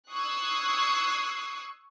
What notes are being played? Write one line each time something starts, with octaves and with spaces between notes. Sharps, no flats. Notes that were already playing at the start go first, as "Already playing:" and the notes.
C#6 D#6 E6 F#6 G#6 C7